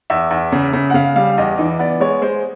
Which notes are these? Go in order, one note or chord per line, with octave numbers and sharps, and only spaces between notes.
E2 E5
E2
C#3
C#3
F#5
C#3 F5
G3 F5
E2 D#5
E3 D#5
B3 D5
G#3 C#5
G#3 C5